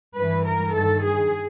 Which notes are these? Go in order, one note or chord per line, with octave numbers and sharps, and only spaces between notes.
G2 E3 B4
A#4
G2 D#3 A4
G#4